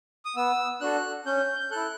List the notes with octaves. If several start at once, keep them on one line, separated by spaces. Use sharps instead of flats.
D#6
B3 E6
D4 F#4 A4 F#6
C#4 G6
G6
E4 A4 F#6